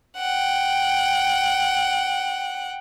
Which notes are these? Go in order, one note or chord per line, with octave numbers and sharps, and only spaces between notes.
F#5 G5